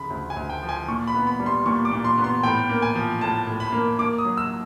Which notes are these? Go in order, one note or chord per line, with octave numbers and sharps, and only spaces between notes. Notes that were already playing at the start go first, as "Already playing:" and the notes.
Already playing: D2 C#3 F3 B5
D2
G#5
D2
G5
F3
G#5
A#2 C#6
B5
B3
B5
G3
C6
A#2 C#6
D6
A#2
C6
B3
C6
A2 G5
A#3
G#5
F3
A2 A5
A2
B5
A#3
A#3 D6
D#6
F#3
E6